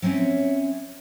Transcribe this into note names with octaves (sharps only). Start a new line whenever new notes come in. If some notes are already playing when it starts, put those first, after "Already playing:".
F#3 C4 C#4 C#5 E5